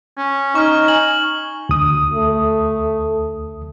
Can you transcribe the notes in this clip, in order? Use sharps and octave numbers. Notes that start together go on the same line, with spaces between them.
C#4
D#4 C#6 F6
G#5 F#7
D2 D#6
A3